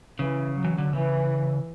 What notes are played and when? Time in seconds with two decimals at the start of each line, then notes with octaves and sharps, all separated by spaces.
0.19 C#3 E3
0.56 F#3
0.64 E3
0.78 D3
0.93 C#3 E3